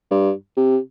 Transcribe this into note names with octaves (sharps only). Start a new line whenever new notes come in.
G2
C3